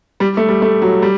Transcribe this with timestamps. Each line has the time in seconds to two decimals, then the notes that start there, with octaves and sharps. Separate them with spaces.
0.20 G3
0.37 A3
0.49 G3
0.62 A3
0.82 F#3
1.02 G3